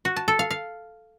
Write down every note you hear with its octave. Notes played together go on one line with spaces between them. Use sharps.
F#4
A5
A4
F5
F5